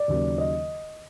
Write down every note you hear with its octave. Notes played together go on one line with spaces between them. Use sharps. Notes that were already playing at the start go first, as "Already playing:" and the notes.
Already playing: D5
D#2 C#3 F#3 A#3
D#5